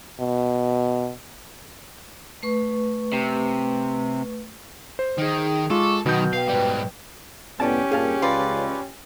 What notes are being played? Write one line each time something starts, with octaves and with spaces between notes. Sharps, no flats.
B2
A3 B4 C#6
C3
C5
D#3 D#4 G#4
G#3 F4 A4 C#6 D6
B2 D#3 F#3 B3 G6
B4 F5 G5
G#2 G3
C2 A2 B3 C#4 G4 D5 A5
G2 A#2 G#4 F5 A5
C#2 F4 B4 D5